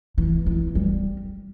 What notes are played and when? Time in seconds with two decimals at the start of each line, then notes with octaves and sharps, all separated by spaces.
0.18 E3
0.46 E3
0.75 G3